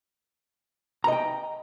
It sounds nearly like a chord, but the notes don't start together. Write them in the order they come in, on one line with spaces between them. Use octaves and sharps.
A#5 D#5 G5